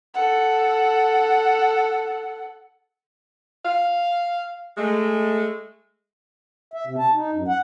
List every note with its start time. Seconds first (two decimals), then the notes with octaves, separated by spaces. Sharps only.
0.14 A4 F#5
3.64 F5
4.78 G#3 A3
6.74 E5
6.87 C3
6.98 A5
7.14 D#4
7.34 F#2
7.48 F#5